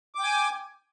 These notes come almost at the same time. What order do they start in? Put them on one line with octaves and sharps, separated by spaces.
D6 G5 G#5